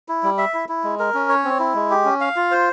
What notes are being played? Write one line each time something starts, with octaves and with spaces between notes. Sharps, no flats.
E4
G3
E5
E4
E4
G#3
A#4
C#4
C#5
C4
E4
G#3
G4
C#4
F5
F4
C5